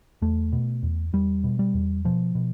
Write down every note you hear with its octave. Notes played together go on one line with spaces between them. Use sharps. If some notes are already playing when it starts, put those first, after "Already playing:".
E2 A3
B2
E2
E2 G3
B2
G3
E2
B2 F3
B2